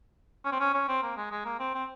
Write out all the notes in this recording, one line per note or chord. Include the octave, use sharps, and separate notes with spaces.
C#4
C4
C#4
C#4
C4
A#3
G#3
G#3
A#3
C4
C4